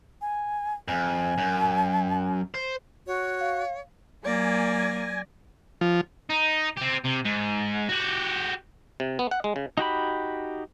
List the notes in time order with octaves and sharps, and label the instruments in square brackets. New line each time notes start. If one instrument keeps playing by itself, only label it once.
[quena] G#5
[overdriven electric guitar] F2 [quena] G#5
[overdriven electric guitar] F#2
C5
[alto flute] F#4 [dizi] C#5
[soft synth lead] F5
[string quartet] F#3 D5 A#6 [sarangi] A#3 [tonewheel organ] G#5
[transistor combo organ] F3
[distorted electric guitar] D#4
C4 G4
C3
G#2
F#4 G4
[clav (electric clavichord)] C3
B3
F#5
G#3
C#3
[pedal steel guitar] D#4 F#4 G4 B5